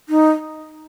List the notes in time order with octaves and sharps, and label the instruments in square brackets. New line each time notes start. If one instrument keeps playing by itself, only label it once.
[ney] D#4